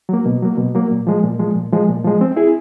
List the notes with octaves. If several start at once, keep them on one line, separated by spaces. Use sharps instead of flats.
F#3 A#3
B2
F#3 A#3
B2
F#3 A#3
A#2
F3 G#3
A#2
F3 G#3
A#2
F3 G#3
A#2
F3 G#3
C4
E4 G#4